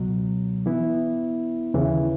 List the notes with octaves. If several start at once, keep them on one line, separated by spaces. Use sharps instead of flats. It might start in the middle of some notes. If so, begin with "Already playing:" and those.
Already playing: C#2 B2 F#3
E3 B3 E4
D#2 C#3 E3